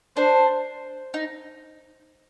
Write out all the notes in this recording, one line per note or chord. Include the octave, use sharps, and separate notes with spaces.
D4 C5
D#4